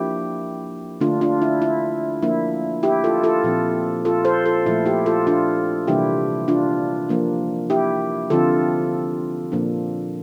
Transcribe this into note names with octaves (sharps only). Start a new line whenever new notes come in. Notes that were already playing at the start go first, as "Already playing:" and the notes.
Already playing: F3 A#3 D4 E4 G4
D3 A3 D4 F4
D4 F4
E4
E4
F3 A#3 D4 E4
E4 G4
F4 A4
F4 A4
A#2 F3 C4
F4 A4
A4 C5
F4 A4
A#2 F3 A3 E4
E4 G4
F4 A4
D4 F4
C3 E3 G3 A#3 D4 E4 G4
D4 F4
F3 A#3 D4
E4 G4
D3 F3 C4 F4 A4
A#2 F3 A#3 D4